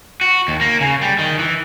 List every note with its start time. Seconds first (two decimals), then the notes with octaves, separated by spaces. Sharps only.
0.21 F#4
0.48 D#2
0.61 A#3
0.81 C#3
1.01 G3
1.19 D#3
1.39 E3